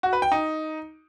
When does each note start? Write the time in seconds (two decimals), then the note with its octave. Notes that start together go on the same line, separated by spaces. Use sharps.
0.03 F#4
0.13 B4
0.22 G5
0.32 D#4